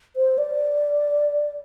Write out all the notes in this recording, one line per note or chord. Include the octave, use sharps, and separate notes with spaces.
C5
D5